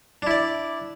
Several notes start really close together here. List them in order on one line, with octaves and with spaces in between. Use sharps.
D4 E4 D5